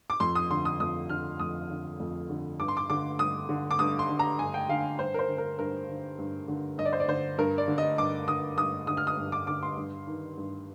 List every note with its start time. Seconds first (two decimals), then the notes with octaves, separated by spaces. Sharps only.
0.10 D6
0.20 F2 C6
0.35 D#6
0.50 D3 C6
0.65 D#6
0.80 F2 D#6
1.10 D3 F6
1.39 F2 D#6
1.70 D3
2.00 F2
2.29 D3
2.60 G2 D6
2.68 C6
2.77 D6
2.90 D3 D6
3.19 G2 D#6
3.49 D3
3.71 D6
3.79 G2 D#6
3.99 C6
4.09 D3
4.19 A#5
4.39 G2 G#5
4.54 G5
4.69 D3 F5
4.99 G2 C5
5.14 A#4
5.19 C5
5.29 D3
5.38 A#4
5.59 G2 A#4
5.89 D3
6.19 G2
6.48 D3
6.78 G2 D#5
6.85 D5
6.93 C5
7.00 D5
7.08 D3 C5
7.38 G2 A#4
7.58 D5
7.68 D3
7.78 D#5
7.98 G2 D6
8.28 D3 D#6
8.57 G2 D#6
8.87 D3 D#6
8.97 F6
9.07 D#6
9.17 G2
9.32 D6
9.47 D3 D6
9.63 C6
9.77 G2
10.07 D#3
10.37 G2